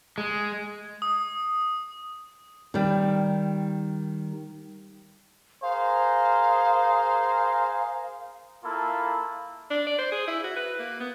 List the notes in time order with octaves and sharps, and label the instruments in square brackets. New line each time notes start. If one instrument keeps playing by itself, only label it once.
[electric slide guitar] G#3
[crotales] D#6
[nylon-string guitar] D#3 G3
[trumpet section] G#4 A#4 C5 [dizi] F5
[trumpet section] A#3 E4 F4 A4
[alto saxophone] D4
D5
C5
G#4
E4
F#4
B4
A#3
B3